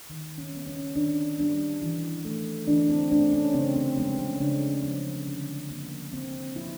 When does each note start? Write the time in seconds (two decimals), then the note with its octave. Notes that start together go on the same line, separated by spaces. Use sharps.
0.10 D#3
0.38 C#4
0.53 G3 B3
0.67 C#4
0.95 D#3 D4
1.38 G3 B3 D4
1.82 E3
2.25 A3
2.67 E3 D4
2.89 C4
3.11 A3 D4
3.33 C#4
3.54 C#3 C4
3.76 C4
3.97 F3 G#3 B3 C4
4.19 C#4
4.40 C#3 D4
4.83 F3 G#3 B3
5.27 D3
5.70 F3 A#3
6.13 D3 C4
6.56 F3 A#3 E4